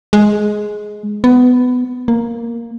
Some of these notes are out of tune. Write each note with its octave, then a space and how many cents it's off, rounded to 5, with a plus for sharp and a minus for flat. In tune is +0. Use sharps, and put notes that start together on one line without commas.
G#3 +10
B3 +15
A#3 +0